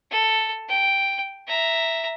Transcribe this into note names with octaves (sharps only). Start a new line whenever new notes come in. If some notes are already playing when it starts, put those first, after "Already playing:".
A4
G5
E5 A#5